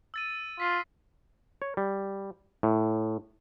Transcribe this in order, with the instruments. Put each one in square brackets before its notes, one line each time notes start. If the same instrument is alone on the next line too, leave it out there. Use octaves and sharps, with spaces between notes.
[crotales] E6 A6 D#7
[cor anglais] F4 [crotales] B6 C7
[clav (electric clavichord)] C#5
G3
A2